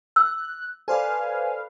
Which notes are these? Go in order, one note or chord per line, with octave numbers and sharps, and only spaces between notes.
E6 F#6
A4 B4 C5 D5 F5 G#5